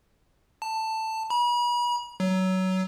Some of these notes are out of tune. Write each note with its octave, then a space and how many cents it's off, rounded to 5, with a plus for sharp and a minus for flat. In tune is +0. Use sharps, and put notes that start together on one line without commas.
A5 +10
B5 -40
F#3 +20